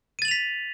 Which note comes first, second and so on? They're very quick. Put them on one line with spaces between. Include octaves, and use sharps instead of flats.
D#7 A6 F#7 F7 B6